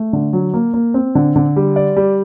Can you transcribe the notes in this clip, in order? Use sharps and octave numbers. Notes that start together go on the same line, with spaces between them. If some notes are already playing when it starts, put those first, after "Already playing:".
Already playing: A3
D3
F#3
A#3
A#3
C4
D3
D3
G3
D5
G3